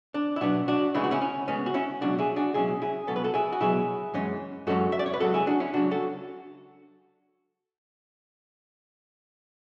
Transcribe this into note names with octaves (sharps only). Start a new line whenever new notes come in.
D4
E4
B2 F#3 B3 D4 F#4
D4 F#4
D2 C#3 G#3 B3 E4
F#4
C#4 E4
C#4
D2 C#3 G#3 B3 C#4
F#4
C#4 E4
C#2 B2 F#3 C#4 D4 F#4
E4 G#4
D4 F#4
C#2 B2 F#3 C#4 E4 G#4
E4 G#4
C#2 B2 F#3 B3 A4
B4
F#4 A4
E4 G#4
F#4
C#2 B2 F#3 B3 E4 G#4
F#2 E3 G#3 C#4
F#2 E3 G#3 C#4 F#4 A4
E5
D5
C#5
B4
C#2 C#3 F#3 F#4 A4
E4 G#4
D4 F#4
C#4 E4
C#2 C#3 F#3 D4 F#4
F#4 A4